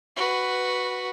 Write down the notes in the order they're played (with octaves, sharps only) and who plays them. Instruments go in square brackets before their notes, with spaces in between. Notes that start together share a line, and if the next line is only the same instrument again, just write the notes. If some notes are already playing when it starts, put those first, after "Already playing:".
[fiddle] F#4 B4